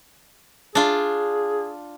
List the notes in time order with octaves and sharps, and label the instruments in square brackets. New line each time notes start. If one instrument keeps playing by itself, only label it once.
[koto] D4 F4 [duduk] G#4